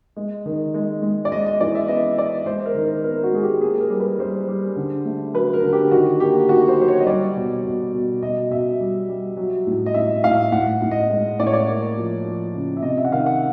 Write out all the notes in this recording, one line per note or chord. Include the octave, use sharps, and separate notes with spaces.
G#3
D#3
G#3
G#3
D5
G#3 D#5
D#5
E3 D5
E5
B3 D#5
B3 D5
G#3 C5
A#4
D#3
A#4
B3 A#4
F#4
G#3 G#4
G4
A#3 G#4
A#4
G3
B4
G3 C5
G3
D3
A3
F#3 B4
A#4
D3
G4
D#3 F#4
A#3 G4
D#3 F#4
C5
F#3 C5
C#5
D#5
G3 D5
B2
B2
B2
B2 D#5
B2 E5
G3
G3
F#3
A2
D#5
A2 E5
A2 F5
A2 F#5
A2
D#5
G#3
A2 D5
C#5
D5
A#3
F3
F3
C#3
E5
C3 D#5
E5
F#5
D#3 F5
F#5